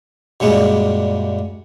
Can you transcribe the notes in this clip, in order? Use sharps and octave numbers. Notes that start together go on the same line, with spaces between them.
F#2 A#2 G3 G#3